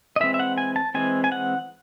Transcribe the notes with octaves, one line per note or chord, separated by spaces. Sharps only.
D#5
E3 G#3 C4 E5
E5
F#5
G#5
A5
E3 G#3 C4 G#5
G#5
F#5